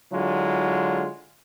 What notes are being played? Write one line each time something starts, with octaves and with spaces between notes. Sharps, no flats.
D3 F#3 G#3 E4 F4